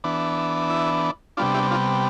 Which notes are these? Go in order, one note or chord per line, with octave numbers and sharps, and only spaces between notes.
E3 B3 D4
E4
C3 G3 B3 D4 F4
E4 G4
D4 F4